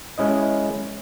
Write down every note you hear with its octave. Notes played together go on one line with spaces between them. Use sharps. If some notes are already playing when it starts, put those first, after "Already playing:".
G#3 C#4 E4 D#5